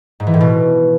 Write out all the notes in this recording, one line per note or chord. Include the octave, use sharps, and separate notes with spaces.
G#2
E3
A2
B2